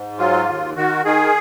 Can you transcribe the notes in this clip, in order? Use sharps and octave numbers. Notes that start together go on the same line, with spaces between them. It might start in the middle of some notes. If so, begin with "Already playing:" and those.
Already playing: G#2
F#3 F4
D#2
D#3 F#4
D#3 G#4